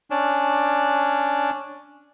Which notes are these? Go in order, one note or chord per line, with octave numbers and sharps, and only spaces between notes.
C#4 D4